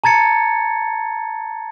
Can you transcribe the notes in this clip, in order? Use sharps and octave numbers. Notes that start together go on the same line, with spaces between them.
A5 A#5 G#6 A6 C#7